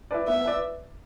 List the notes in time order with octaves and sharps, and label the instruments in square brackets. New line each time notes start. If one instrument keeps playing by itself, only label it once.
[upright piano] E4 B4 D5
[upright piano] B3 [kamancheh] E5
[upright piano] E4 B4 D5